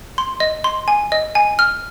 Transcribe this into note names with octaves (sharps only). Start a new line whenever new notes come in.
C6
D#5
C6
G#5
D#5
G#5
F6